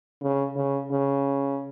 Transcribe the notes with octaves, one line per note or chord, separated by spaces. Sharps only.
C#3
C#3
C#3